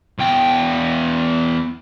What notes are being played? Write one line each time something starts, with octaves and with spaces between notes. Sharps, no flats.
E2 G5